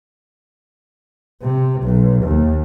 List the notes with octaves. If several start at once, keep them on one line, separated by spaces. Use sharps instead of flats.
C3
B1
D#2